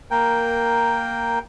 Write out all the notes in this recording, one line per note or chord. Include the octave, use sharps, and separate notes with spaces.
A#3 A#4 G5